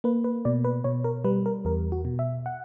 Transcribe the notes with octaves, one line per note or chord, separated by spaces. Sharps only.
A#3 B4
B4
B2 D5
B4
B2 C#5
A#4
G3 B4
A#4
E2 A#4
F#4
B2
E5
F#5